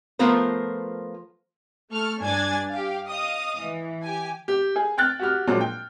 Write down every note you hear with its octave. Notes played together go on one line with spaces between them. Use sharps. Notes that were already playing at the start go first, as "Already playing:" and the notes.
F3 A3 B3 F4 A#4 C5
A3 A4 C#6 F6
G2 D4 G#5 G#6 A6
G4 F5
D#5 F5 D#6
E3
G4 G#5
G4
G#4
G5 F6 F#6 A6
F#4 G4 F6
A#2 F3 F#3 G#3 D4
G5